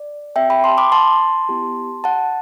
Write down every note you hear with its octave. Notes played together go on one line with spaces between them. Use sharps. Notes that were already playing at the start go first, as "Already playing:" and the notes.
Already playing: D5
C4 G4 E5 G5
G5 B5
A5 C6
B5 D6
A5 C6
B3 E4 G4
F#5 A5